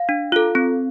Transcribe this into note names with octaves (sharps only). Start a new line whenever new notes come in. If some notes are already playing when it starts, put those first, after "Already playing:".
Already playing: F5
D4
F4 A4
C4